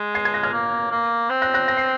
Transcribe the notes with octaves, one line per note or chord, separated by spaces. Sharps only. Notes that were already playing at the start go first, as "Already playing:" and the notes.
Already playing: G#3
G#6 C7
G#6 C7
F#6 A#6
F6 G#6
A#3
A#3
C4
F#6 A#6
F#6 A#6
A#6
C7